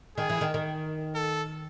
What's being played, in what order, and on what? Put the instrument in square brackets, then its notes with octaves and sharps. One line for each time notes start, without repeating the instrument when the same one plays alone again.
[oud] D#3 [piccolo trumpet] G#4
[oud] E3
D#3
D#3
[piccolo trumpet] A4